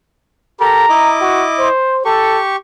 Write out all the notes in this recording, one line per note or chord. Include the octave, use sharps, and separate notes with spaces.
G4 A4 A#4 A#5
E4 D#5 D6
F#4
C5
G4 A4 C#6